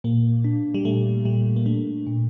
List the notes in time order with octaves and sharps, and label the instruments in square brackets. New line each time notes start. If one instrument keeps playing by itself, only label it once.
[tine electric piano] A#2 [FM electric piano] A#3
[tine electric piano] D4
[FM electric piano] G3
[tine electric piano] A#2 [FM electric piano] A3
[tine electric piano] A#2 [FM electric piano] G3
[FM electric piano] A#3
[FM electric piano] A3 [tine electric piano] D4
[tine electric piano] A#2